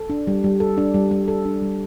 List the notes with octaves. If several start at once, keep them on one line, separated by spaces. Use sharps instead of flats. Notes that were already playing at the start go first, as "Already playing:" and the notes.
Already playing: A4
D4
G3
G3
A4
D4
G3
G3
A4
D4
G3